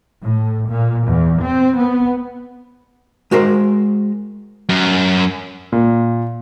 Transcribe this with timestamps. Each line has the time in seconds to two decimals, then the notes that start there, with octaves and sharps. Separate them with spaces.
0.21 A2
0.69 A#2
1.05 E2
1.42 C4
1.75 B3
3.31 G#3 F#4 A#4 C5
4.69 F#2
5.72 A#2